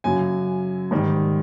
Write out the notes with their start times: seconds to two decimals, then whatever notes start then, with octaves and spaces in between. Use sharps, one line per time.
0.04 F#2 C#3 F#3 G#5
0.91 G#2 D#3 G3